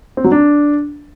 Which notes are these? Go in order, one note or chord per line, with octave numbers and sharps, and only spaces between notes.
C4
F#3
D4